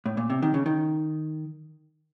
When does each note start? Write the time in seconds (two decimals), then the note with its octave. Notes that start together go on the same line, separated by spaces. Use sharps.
0.06 A2
0.17 A#2
0.30 C3
0.42 D#3
0.54 C#3
0.66 D#3